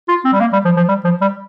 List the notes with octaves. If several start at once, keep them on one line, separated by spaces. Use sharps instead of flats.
F4
C4
G3
A#3
G3
F3
F3
G3
F3
G3